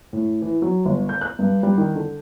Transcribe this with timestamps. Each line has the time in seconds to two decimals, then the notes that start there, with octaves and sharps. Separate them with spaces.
0.13 A2
0.42 E3
0.62 F#3
0.85 G1
1.09 G6
1.21 F#6
1.39 G2
1.63 G3
1.78 D#3
1.95 D3